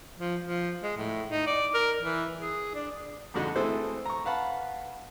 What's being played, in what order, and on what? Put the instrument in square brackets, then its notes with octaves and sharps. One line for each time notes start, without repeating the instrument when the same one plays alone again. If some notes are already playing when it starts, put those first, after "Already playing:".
[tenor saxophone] F3
F3
G#3
A2
D#4
D5
A#4
E3
G#4
D4
[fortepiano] F2 G#2 D3 F#4 D#5
E3 A3 C4 G#4 A4 C5
A#5 C#6
B4 F5 F#5 A5 B5